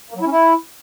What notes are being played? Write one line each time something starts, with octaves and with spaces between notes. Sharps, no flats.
A#3
F#3
E4
C#4
E4